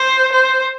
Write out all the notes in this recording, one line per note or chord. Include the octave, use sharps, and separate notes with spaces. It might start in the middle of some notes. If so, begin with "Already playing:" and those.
Already playing: C5
C5